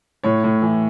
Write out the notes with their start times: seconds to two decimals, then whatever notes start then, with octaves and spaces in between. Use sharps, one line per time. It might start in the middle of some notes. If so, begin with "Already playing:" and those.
0.23 A2 C#5
0.44 A2
0.62 E3